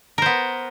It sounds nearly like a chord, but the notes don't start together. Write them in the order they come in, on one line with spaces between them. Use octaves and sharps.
A#4 C5 B3